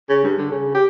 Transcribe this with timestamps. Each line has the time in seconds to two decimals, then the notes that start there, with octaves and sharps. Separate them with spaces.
0.09 C#3
0.24 G2
0.38 D3
0.51 C#3
0.75 G4